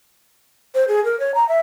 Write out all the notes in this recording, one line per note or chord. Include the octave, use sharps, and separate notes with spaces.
C5
G#4
A#4
C#5
A#5
E5